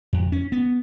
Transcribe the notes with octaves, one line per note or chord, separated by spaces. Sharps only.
F2
C#4
B3